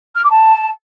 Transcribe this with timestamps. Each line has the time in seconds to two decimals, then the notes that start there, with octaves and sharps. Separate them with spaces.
0.16 F6
0.23 D6
0.31 A5